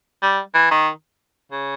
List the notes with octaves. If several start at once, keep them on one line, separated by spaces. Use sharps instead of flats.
G3
E3
D#3
C#3